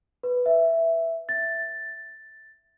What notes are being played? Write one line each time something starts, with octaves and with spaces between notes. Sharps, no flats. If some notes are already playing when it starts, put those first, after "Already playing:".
B4
E5
A6